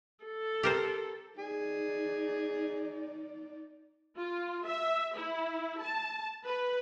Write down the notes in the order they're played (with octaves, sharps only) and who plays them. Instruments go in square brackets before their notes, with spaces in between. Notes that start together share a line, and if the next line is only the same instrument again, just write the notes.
[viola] A4
[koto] G4 A#4 C5
[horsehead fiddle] D#4 D5 [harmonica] G#4
[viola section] F4
E5
E4
A5
B4